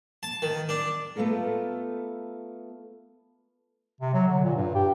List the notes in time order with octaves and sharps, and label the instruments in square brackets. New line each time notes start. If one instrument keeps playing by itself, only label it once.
[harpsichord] A5
D#3
D4
[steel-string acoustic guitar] A3 B3 F4 A4 A#4
[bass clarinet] C3
F#3
D3
A#2
G2
G4